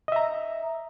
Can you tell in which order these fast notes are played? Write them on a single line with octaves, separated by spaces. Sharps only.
D#5 E5 A#5